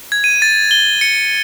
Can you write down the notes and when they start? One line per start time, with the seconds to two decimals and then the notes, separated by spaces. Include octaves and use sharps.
0.12 G#6
0.24 D#7
0.42 A6
0.71 G7
1.01 C#7